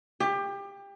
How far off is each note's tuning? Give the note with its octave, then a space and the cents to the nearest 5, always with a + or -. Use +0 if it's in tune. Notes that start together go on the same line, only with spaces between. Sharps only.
G4 +25